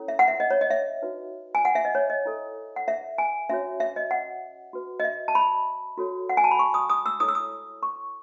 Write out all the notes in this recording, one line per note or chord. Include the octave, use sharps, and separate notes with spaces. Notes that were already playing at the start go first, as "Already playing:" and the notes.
Already playing: C#4 E4 A4 C#5
E5
F#5
E5
D#5
C#5
D#5
E5
D#4 F#4 B4
G#5
F#5
E5
D#5
C#5
D#5
E4 A4 C#5
F#5
E5
G#5
C#4 F#4 C#5 E5
E5
D#5
F#5
F#4 B4
D#5
E5
A5
B5
F#4 A4 C#5
F#5
G#5
A5
B5
C#6
D#6
D#6
E6
E4 A4 C#5 D#6
E6
D#6
C#6